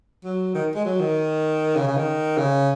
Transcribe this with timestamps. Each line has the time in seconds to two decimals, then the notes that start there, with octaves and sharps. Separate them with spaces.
0.24 F#3
0.55 D#3
0.75 G#3
0.85 F#3
1.00 D#3
1.77 C#3
1.87 C#3
1.97 D#3
2.38 C#3